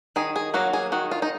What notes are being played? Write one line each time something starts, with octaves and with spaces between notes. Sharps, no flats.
D#3 G#4
G#4
F#3 A#3 F#4
G#4
D#3 F#4
F4
D#4